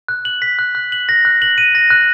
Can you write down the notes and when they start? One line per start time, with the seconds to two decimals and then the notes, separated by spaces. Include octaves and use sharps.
0.08 F#6
0.25 F#7
0.42 B6
0.59 F#6
0.75 F#6
0.92 F#7
1.09 A#6
1.25 F#6
1.42 F#7
1.58 D#7
1.75 A#6
1.90 F#6